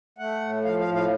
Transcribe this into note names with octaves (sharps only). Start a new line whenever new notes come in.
A3 F#5
A2
F3 F5
F5
A2
F5